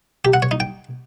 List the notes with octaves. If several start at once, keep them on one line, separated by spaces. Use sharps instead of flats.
G4
F#5
C#5
D#4
G5